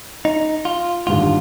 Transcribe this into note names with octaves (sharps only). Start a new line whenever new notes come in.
D#4
F4
G#1 G2 D3 G3 F4